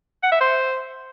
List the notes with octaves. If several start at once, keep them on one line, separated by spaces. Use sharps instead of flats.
F#5
E5
C5